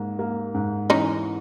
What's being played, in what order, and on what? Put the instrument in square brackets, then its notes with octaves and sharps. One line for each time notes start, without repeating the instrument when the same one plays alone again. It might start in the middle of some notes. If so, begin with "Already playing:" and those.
Already playing: [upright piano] G#2 A#3
A#3
G#2
[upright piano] E3 [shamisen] C#4 D#4